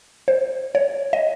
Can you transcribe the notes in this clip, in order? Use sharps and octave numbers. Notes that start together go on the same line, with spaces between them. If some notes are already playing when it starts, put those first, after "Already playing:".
C5
C#5
D#5